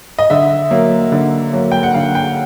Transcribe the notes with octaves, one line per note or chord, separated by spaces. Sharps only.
D#5
D3 E5
F#3 A#3
D3
F#3 A#3
G5
F#5
D3 F5
G5